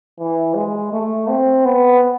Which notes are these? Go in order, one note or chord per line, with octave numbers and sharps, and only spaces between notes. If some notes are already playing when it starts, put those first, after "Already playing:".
E3
G#3
A3
C4
B3